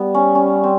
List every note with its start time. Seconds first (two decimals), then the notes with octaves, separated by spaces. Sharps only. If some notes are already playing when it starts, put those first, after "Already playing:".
Already playing: G3 B3
0.15 C#4
0.35 C#4
0.64 C4